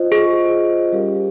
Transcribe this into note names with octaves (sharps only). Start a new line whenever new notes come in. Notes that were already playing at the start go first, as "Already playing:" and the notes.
Already playing: F4 C5 D#5
G#4
F4 C5 D#5
G3 C#4 G4 A#4 F5